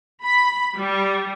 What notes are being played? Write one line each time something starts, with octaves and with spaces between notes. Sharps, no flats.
B5
G3